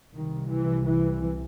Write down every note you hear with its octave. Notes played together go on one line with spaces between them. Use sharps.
C2 C3 D#3
E3
E3